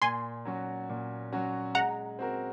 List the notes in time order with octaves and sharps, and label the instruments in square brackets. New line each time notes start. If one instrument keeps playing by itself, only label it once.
[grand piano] A#2 [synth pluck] G#5 C6
[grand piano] F#3 C#4 F#4
A#2
F#3 C#4 F#4
[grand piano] G#3 [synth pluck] F#5 A#5
[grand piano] C4 F#4 A#4